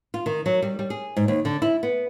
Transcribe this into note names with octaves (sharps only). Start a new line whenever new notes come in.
F4
D#3
F#3
G3
G3
G#4
G#2
D#2
D3
E4
B3